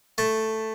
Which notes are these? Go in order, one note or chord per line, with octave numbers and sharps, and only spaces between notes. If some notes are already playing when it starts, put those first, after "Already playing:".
A3 A5